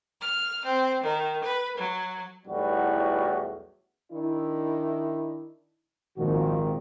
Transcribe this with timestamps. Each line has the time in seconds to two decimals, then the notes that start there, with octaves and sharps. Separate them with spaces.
0.21 F6
0.64 C4
1.03 D#3
1.44 B4
1.76 F#3
2.46 B1 E2 A2 G3 F#4
4.12 D#3 D4 E4
6.17 G#1 A#2 D#3 F3 F4 F#4